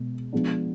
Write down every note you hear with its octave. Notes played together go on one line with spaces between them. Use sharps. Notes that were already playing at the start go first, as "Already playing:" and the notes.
Already playing: B2 G#3
F3 G#3 B3 D4